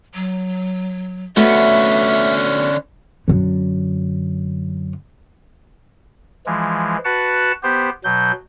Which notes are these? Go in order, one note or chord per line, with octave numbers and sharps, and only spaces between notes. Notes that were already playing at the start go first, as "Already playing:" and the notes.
F#3
D3 A3 B3 C#4 F#4 E5
F#2 D3
E3 F3 G#3
F#4 B4 F#5 A5
B3 G4 C5
B2 F#3 G6